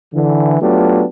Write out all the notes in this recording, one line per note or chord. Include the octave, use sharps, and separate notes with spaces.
D3 E3
F#3 A3 B3 D4 F4 G4